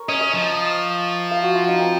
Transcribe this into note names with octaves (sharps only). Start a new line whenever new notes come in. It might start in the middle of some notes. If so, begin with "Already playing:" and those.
Already playing: A#4 C#5
C#4 D#5
D#5
F3
F5
F#4
F4
D#4
C4